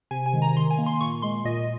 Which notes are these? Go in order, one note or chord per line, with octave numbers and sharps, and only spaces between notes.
C3 G#5
G#5
D#3 G#3
A#5
D#3 C6
G#5
A#3
C6
A#2 C#6
G#3 C6
A#2 D#5